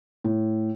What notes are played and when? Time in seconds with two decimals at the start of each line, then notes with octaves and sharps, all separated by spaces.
0.24 A2